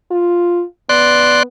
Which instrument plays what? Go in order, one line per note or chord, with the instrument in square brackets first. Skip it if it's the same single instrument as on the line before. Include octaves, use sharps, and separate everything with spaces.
[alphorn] F4
[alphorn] B3 [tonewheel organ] D5 C6 F#6